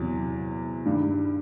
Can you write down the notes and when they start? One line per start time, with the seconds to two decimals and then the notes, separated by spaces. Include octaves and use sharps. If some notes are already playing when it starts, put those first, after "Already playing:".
Already playing: E2 C3 F#3
0.85 G2 D#3 G3